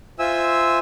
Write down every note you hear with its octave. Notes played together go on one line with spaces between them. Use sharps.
F4 C5 E5 G#5 E6